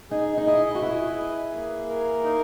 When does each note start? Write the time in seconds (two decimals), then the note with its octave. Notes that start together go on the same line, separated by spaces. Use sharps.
0.11 D#4 G#4
0.38 D#4
0.47 E4 D#5
0.75 F#4
0.82 E4 B4
1.17 G#4
1.53 A#3
1.89 A#4
2.24 D#4